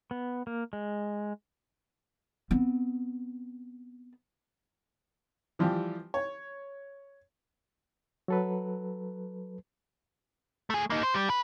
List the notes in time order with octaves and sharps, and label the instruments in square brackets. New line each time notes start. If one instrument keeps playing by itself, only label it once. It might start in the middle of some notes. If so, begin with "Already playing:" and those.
[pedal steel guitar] B3
A#3
G#3
[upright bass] B3 C4
[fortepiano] E3 F3 G3 G4
C#5
[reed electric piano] F#3 A4 B4
[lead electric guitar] A3 G#4
A#3 D#4
C5
G3
B4